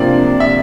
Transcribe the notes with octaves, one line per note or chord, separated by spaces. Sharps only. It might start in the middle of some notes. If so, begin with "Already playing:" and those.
Already playing: C3 F3 A#3 D4 D5
E5